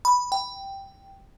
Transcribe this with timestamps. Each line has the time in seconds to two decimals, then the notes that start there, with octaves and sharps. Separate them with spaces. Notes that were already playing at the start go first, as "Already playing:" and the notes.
0.05 B5
0.32 G5